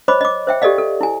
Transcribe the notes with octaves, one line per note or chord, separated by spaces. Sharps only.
C5 C#5 D#5 B5 D6
D#5 D6
C5 E5 G5
G4 A4 D5 D#5 F5
A4
E4 G#5